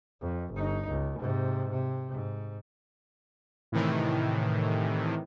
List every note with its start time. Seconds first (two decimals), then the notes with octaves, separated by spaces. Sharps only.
0.21 F2
0.54 G1 D#4
0.89 C#2
1.19 G#2 C3
1.71 C3
2.12 G#2
3.72 A2 C3 D#3 E3